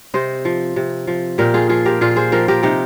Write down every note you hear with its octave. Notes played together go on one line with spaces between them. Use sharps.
C3 C5 D#5
F3
C3
F3
A#2 G4 A#4
F4 G#4
F3 F4 G#4
G4 A#4
A#2 F4 G#4
G#4 C5
F3 G4 A#4
G4 A#4
C3 D#4 G4